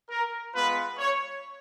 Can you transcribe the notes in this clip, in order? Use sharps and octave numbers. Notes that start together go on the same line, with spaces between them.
A#4
G#3 B3 F4 B4
C#5